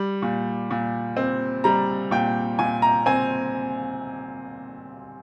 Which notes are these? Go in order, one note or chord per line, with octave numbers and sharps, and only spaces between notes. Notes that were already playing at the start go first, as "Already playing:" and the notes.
Already playing: G3
A#2
A#2
C4
G3 A#5
A#2 G5
A#2 G#5
A#5
C4 G#5